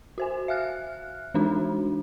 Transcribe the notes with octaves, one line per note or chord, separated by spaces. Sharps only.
F#4 C5 G#5
E5 F5 F6 F#6
E3 G#3 D4 D#4 F#4